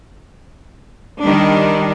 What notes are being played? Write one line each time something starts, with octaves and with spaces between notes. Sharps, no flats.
D#3 G3 D4